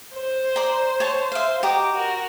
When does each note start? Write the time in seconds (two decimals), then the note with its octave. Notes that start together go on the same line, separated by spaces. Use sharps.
0.15 C5
0.56 D5 A#5
1.00 C#5 A5
1.32 C5 E5 F5
1.63 F#4 G4 D#5 A#5 D6
1.93 F#4 A#4